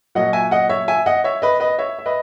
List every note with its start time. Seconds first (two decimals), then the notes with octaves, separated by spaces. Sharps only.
0.15 A#2 F#3 A#3 D#5 F#5
0.33 E5 G#5
0.51 D#5 F#5
0.69 C#5 E5
0.88 E5 G#5
1.06 D#5 F#5
1.24 C#5 E5
1.42 B4 D#5
1.60 B4 D#5
1.78 C#5 E5
1.99 E5
2.06 B4 D#5